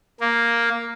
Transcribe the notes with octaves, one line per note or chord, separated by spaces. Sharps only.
A#3